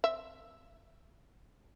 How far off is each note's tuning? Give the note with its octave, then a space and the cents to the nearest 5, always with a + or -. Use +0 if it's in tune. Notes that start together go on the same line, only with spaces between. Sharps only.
C4 +0 E5 +0